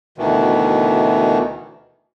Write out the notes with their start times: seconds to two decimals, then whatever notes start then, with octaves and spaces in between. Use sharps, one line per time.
0.18 D2 B2 D#3 E3